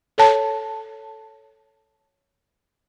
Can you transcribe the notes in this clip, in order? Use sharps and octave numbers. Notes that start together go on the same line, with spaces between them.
A4 C#5 A5